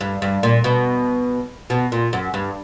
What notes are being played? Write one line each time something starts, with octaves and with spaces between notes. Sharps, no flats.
G2
G2
A#2
B2
B2
A#2
F#2
G2